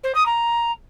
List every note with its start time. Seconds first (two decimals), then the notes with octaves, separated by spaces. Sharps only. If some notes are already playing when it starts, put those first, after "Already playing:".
0.03 C5
0.15 D#6
0.26 A#5